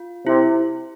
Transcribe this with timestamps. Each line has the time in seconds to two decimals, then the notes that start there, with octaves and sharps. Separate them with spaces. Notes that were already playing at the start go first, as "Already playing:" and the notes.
Already playing: F4
0.27 C3 E4